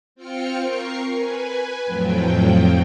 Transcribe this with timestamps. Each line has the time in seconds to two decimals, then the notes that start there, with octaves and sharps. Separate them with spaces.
0.15 C4 F4 G5 F6 C#7
0.62 A#4 C#6 C7
1.11 B4 G#5
1.86 F2 A2 F3 F#3 G5